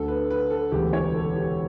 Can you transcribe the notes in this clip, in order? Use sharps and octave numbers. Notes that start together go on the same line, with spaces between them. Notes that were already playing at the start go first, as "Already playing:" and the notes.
Already playing: D2 D3 A4
B4
B4
A4
E1 D2 C#3 E3 G4
C#5
A4
G4